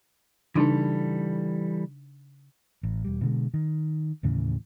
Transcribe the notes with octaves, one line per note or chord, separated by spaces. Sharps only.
C#3 E3 G3 D4 D#4 A4
A1
E1 G3
B2 D3 G#3
D#3
D#2 A2 C#3 E3